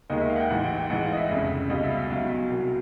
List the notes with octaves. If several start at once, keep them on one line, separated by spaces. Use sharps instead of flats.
D#2 D#3 G#3 D#5
E5
F5
F#5
G5
A1 G#2 E3 F#5
G5
G5
A1 G#2 E3 G#3 F#5
F5
D#5
E5
F1 F2 C#3
C#2 B2 G3 D#5
E5
F5
E5
B1 B2 F#3 F5
C2 B2 F#3